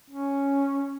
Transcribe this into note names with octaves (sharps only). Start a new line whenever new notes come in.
C#4